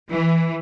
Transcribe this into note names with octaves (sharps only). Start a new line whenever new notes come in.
E3